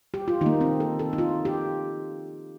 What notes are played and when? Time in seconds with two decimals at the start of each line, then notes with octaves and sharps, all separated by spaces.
0.14 G4
0.28 F4
0.41 D#3 A#3 D#4
0.61 C4
0.80 A4
0.99 A4
1.13 D#4
1.18 F4
1.45 G4